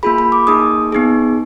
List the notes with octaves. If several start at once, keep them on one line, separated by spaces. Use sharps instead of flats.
A#3 F4 G#4 B5
B5
D6
A#3 D#4 G#4 D#6
B3 D#4 G#4